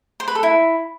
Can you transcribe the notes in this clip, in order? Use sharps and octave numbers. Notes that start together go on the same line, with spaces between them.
C5
B4
A4
E4